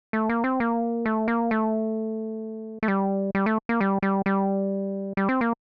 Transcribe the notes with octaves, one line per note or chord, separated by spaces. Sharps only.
A3
A#3
C4
A#3
A3
A#3
A3
A3
G3
G3
A3
A#3
G3
G3
G3
G3
C4
A#3